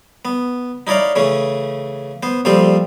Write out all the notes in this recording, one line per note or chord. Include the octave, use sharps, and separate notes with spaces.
B3
D#4 E4 C#5 D5 F5
C#3 E3 A3 C#4
B3 C5
A#1 F3 G3 C4 A4 C5